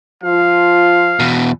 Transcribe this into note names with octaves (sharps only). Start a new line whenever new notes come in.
F3 F4 F5
E2 B2